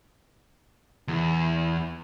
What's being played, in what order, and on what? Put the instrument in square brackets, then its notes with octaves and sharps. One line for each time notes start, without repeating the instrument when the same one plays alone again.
[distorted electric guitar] E2